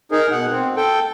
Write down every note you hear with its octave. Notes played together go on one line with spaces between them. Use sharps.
D#4 G#4 A#4
B2 F#5
C4
A4 G5